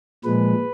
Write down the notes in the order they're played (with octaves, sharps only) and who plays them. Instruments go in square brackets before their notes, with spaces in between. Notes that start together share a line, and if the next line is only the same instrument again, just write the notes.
[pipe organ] A#2 F3 G#3 B4